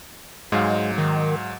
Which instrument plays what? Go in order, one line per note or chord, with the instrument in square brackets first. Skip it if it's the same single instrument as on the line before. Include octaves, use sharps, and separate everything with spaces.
[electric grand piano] G#2 F#3 F5 [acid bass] G#3
[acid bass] D#3